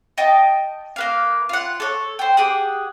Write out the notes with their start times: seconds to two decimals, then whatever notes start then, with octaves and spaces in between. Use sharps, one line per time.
0.18 D#5 G5 A5
0.96 A#3 B4 F5
1.49 F4 F#5
1.80 A4 C#5
2.19 C5 G5
2.37 G4 G#4 F#5